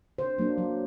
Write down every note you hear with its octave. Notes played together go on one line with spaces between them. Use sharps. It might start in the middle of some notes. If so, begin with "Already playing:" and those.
D3 C5
F#3 A#3 D4
F#3